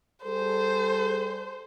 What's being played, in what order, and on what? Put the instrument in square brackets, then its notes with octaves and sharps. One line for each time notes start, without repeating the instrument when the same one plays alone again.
[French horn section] G3 G#4 A4 [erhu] C5